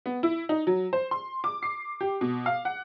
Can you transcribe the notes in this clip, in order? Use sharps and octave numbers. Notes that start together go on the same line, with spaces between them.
B3
E4
D#4
F#3
C5
C6
D6
C7
G4
B2
F5
F#5